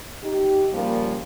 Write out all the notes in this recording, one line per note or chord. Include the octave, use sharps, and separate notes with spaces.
D#4 G4
C#3 F3 G3 A#3